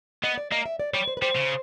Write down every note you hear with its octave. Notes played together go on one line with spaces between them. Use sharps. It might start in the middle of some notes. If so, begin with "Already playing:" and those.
B3 D#5
D5
A#3 D#5
E5
D5
G3 C#5
C5
B4
G3 C5
C#3